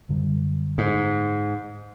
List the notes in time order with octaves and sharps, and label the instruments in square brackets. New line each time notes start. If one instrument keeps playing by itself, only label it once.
[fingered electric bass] F#2 D3 G3
[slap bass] G#2